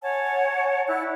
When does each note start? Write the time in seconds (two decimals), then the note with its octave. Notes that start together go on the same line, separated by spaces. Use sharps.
0.03 C#5 F#5 G#5 A5
0.88 E4 D5 E6 F#6